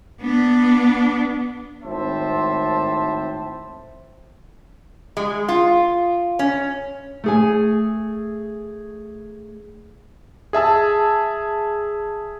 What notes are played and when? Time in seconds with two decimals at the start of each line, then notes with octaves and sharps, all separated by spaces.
0.21 B3 D4
1.83 G#1 A2 C4 C5 E5 A5
5.17 G#3
5.48 F4
6.39 C#4
7.24 A3 G#4 G#5
10.53 G#4 E5 A5 E6